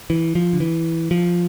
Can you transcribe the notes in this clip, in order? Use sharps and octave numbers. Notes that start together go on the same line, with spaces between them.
E3
F3
D3
E3
F3